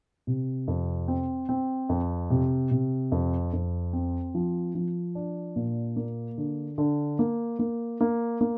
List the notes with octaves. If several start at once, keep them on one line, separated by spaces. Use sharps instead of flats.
C3
F2
C4
C4
F2
C3
C3
F2
F2
C4
F3
F3
D4
A#2
A#3
D3
D3
A#3
A#3
A#3
A#3